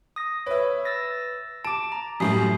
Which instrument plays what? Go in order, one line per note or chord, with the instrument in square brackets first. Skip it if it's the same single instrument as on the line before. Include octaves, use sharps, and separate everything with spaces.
[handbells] D#6 A#6
[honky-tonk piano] B4 E5 [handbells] C#5
[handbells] E6 A6 A#6
[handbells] A5 D6 [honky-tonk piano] D7
[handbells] A#5
[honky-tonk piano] F#2 A2 G3 [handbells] D#6 C7